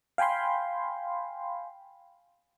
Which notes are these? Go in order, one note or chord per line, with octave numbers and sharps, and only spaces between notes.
F5 G5 G#5 B5 C6